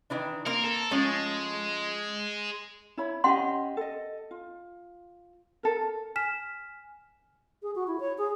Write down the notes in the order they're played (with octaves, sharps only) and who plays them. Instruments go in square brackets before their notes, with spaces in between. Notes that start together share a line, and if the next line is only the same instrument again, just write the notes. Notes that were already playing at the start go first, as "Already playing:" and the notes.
[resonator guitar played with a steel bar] D#3 E3 D4
[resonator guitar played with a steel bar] A#3 C4 [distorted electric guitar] A#4
[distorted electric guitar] A4
[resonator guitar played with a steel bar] F3 A3 C#4 [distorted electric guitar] G#3
[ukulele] E4 C#5 B5
[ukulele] C#4 G4 D#5 [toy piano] F#5 C6
[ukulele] A4 D#5
F4
A4 A#4
[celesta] G#5 F6 B6 E7
[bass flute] G#4
F#4
E4
C#5
G#4